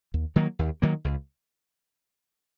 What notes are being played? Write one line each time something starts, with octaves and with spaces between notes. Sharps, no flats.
D#2
D#3 F#3 A#3
D#2
D#3 F#3 A#3
C#2